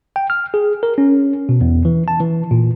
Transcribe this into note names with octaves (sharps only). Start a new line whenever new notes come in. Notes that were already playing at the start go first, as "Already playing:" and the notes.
G5
F6
G#4
A#4
C#4
B2
E2
E3
A5
E3
A#2